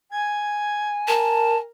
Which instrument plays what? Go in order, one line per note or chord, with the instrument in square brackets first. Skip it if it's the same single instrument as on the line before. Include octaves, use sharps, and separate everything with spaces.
[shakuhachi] G#5 [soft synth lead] G#6
[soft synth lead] A#4 [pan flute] A5